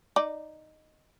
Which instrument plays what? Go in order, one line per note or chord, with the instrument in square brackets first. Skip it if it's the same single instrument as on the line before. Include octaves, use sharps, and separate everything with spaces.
[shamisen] D#4 D5